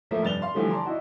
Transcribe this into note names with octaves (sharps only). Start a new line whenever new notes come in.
F3 A3 A#3 E5
F1 G2 A6 F7 G7
F5 C6
D3 E3 F3 G3 A3
D5 A5 A#5 C6
D#4 E4 F#4